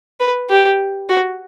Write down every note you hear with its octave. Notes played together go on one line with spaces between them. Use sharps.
B4
G4
F#4